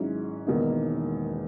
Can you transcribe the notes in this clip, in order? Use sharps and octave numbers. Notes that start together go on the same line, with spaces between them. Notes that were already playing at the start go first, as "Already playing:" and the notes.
Already playing: G#1 G#2 F#3 C#4 E4
E1 E2 D#3 A#3 D#4